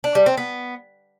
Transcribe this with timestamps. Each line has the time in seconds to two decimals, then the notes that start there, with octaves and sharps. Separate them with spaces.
0.04 D4
0.15 G3
0.26 C4
0.37 B3